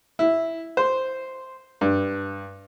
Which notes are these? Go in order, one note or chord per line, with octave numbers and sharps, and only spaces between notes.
E4
C5
G2